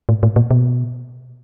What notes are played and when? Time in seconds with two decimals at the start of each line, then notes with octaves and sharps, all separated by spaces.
0.09 A2
0.23 A2
0.36 A#2
0.51 B2